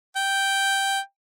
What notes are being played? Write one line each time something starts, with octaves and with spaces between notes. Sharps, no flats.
G5